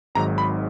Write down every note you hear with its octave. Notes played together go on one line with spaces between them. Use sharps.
G#1 G#2 D#3 F#3 A#5
B5